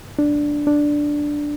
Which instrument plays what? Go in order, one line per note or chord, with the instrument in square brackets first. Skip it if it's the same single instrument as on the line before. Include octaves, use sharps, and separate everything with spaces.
[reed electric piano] D4
D4